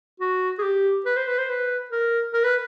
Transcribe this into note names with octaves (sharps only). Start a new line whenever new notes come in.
F#4
G#4
G4
B4
C5
B4
C5
B4
A#4
A#4
B4